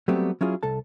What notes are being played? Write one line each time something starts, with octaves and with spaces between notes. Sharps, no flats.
F#3 G3 A3 B3 C4 G4
F#3 C#4 E4 F4 G#4
C2 A4 A5